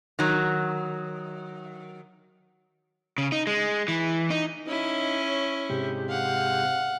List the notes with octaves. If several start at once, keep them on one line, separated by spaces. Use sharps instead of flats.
D#3 F#3
C#3
D#4
G#3
E3
D#4
C#4 D#4 E4
C#5
G#2 C3 G4
F5 F#5